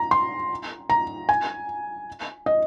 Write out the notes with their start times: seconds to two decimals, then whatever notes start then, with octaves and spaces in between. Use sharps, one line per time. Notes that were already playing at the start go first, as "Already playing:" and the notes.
Already playing: A#5
0.11 C6
0.90 A#5
1.29 G#5
2.46 D#5